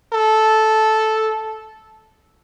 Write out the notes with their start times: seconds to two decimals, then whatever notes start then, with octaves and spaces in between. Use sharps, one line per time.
0.13 A4